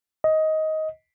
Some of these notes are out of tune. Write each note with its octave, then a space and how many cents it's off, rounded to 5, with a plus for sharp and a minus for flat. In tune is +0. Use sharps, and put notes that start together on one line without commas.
D#5 +15